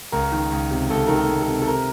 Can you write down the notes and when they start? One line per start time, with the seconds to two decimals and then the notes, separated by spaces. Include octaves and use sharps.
0.12 C#2 A#4
0.32 D#3
0.52 C#2
0.71 C3
0.90 C#2 A4
1.07 D#3 A#4
1.15 A4
1.28 C#2
1.42 A4
1.48 C3
1.62 A4
1.67 C3 A#4